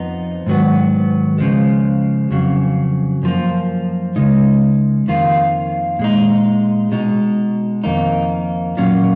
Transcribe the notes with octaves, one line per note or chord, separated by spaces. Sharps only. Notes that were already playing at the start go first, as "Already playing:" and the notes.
Already playing: F2 F3 B3 D#4
G#2 D#3 F#3 B3
C#3 F3 G#3
F2 C#3 F#3
F#2 F3 A#3
C#3 G#3 D#4
F2 D#3 A#3 F4
A#2 G#3 D#4
B2 G#3 D#4
F2 D#3 A#3 D#4
A#2 F#3 A#3 C#4 F4